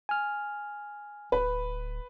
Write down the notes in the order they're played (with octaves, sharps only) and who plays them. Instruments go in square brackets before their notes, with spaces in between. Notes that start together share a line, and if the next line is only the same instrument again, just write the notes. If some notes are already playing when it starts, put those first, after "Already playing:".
[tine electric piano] G#5 F6
[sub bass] D1 [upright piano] B4